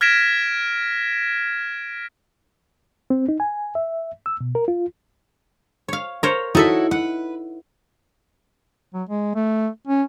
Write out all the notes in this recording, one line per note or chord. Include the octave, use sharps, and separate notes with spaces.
F6 G#6 A#6 B6 D7 E7
C4
D#4
G#5
E5
E6
B2
A#4
F4
C#5 F5
A#4 C5 C#5
D#4 E4 F#4 A4 C#5 E5
B4 F#5
F#3
G#3
A3
C#4